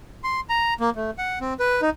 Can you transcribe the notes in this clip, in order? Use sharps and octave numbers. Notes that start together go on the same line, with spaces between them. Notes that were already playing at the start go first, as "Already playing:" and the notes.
C6
A#5
A#3
A3
F#5
C4
B4
D#4